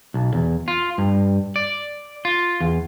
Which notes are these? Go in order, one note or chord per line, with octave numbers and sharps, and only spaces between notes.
B1
E2
F4
G2
D5
F4
E2